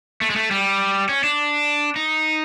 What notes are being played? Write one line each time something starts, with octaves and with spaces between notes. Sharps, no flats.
A3
G#3
A3
G3
C#4
D4
D#4